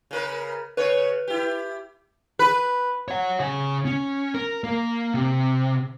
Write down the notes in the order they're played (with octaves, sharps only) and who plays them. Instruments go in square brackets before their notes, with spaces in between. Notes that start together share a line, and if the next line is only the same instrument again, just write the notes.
[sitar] C#3 A#4 B4
[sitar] C#3 C#5 [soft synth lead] B4
[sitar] E4 G4
B4
[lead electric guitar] C#5 F#5
C#3 G#5
C#4
A#4
A#3
C3